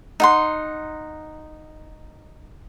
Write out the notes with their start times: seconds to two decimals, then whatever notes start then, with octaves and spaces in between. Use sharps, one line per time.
0.20 D#4 F#5 C6